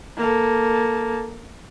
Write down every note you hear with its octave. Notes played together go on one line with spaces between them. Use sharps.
A#3 A4